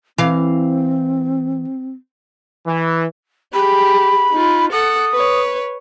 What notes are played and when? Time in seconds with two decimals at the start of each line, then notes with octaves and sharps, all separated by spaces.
0.18 E3 C4 F5
2.66 E3
3.53 G4 G#4 B5
4.32 D#4 F4
4.72 A4 F#5 D#6
5.12 B4 C#5